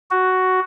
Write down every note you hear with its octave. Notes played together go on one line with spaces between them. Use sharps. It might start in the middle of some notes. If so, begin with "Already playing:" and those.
F#4